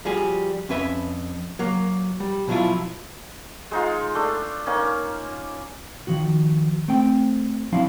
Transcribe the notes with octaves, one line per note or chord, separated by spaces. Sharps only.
F3 G3 F#4 G#4
F2 C#4 B4 E5 B5
F#3 A#3
G3
B2 F3 F#3 E4 F4
G#3 D#4 F4
A3 D4
A#3 C#4 D#4
D#3 F3 F#4
A3 C4 G5
F3 F#3 C4 D4 E4 F5